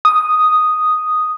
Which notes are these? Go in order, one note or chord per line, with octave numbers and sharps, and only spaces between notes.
D#6